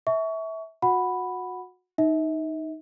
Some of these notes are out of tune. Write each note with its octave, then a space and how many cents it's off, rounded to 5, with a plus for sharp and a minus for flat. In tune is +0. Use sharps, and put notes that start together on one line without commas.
E5 -20 A5 -25 C#6 +25
F#4 -30 F#5 -5 B5 +0
D#4 +0 E5 -40